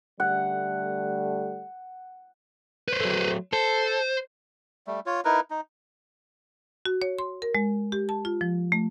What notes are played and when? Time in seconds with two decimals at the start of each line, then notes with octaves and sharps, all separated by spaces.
0.20 D3 G3 A3 F#5
2.88 B4 C5
3.01 F#3 A3
3.53 A4 C5
4.87 G3 A3
5.06 F4 C#5
5.25 D#4 E4 A#4 B4
5.50 D#4
6.85 F#4
7.02 C#5
7.19 C6
7.42 A#4
7.55 G#3
7.92 G4
8.09 A5
8.25 F4
8.41 F3
8.72 A3